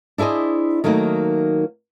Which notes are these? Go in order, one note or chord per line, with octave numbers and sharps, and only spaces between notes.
D4 E4 G#4 C5 D#5
D#3 F#3 A3 A#3 D#4